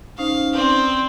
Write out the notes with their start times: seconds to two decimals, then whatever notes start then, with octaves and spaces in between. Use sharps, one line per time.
0.18 C#4 D#4 C5 F5
0.54 C4 D5